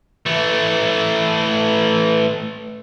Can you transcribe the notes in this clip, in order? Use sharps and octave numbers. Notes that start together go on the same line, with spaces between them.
E3 A3